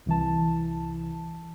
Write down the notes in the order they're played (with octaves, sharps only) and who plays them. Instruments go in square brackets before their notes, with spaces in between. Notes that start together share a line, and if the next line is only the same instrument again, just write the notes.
[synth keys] C2 E3 A5